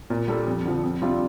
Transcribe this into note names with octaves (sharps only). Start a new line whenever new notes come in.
A#2
G3 D4 A4
F2
D3 F3
F2
C3 G3 D4 F4